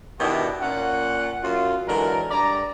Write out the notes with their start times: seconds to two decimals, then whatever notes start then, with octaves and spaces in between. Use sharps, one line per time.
0.19 B2 D#3 D4 E4 F#4 G4
0.62 A#2 C#4 F#5
1.43 F#2 F4
1.87 D3 E3 F#3 G#3 A#4
2.31 G2 D5 A#5